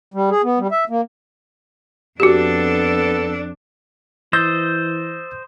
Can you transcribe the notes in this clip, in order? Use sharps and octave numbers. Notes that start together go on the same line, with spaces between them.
G3
G#4
B3
G3
E5
A#3
F2 B3 D4 F#4 G4 A4
E3 C5 D#5 E6 G6 A6